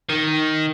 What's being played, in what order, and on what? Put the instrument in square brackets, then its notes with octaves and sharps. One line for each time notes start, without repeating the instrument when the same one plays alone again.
[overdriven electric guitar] D#3